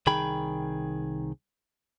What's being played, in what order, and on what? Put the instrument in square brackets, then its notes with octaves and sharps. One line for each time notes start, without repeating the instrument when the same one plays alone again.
[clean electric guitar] C2 D#3 G#4 G5 B5